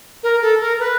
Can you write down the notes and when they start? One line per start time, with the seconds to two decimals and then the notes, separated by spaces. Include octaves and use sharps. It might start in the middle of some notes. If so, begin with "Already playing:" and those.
0.23 A#4
0.42 A4
0.60 A#4
0.79 B4